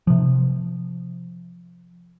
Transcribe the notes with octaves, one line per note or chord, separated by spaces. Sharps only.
C3 F3